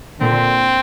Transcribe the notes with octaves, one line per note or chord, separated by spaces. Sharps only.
A#2 D3 C4